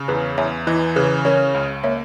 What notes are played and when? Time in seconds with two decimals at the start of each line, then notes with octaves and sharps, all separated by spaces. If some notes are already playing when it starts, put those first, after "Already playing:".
Already playing: C#3
0.08 E2 G#4 B4
0.38 E2 C#5 E5
0.67 E3 B4 D#5
0.96 C#3 G#4 B4
1.25 C#4 A#4 C#5
1.54 C#2
1.84 A#3 C#5 E5